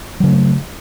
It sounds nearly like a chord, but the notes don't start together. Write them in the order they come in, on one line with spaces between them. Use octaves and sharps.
F#3 C#3 A3